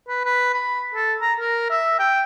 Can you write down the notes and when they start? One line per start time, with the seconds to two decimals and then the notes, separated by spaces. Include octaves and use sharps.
0.08 B4
0.25 B4
0.54 B5
0.94 A4
1.21 A#5
1.40 A#4
1.70 E5
1.99 G5